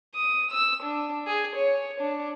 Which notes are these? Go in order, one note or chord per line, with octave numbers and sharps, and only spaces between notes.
D#6
E6
D4
G#4
C#5
D4